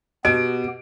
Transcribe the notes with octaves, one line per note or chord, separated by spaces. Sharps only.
B2 B3 G4 D#5 D7